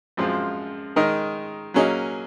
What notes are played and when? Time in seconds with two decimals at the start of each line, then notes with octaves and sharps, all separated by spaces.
0.17 F#2 F3 G#3 C4 F4
0.96 D#3 G#3 D#4 A#4 D#5
1.74 F#3 A#3 C#4 G#4 D#5